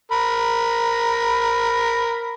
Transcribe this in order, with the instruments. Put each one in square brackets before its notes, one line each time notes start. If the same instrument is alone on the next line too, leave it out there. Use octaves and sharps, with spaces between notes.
[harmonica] A#4 B5